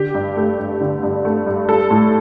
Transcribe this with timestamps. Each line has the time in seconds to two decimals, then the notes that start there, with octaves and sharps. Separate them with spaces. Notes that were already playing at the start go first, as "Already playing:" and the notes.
Already playing: D3 G4
0.14 G2
0.36 A3
0.59 G2
0.81 D3
1.03 G2
1.25 A3
1.47 G2
1.69 G3 A4
1.90 A2